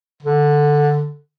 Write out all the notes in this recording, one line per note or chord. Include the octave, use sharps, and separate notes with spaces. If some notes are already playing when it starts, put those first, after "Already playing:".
D3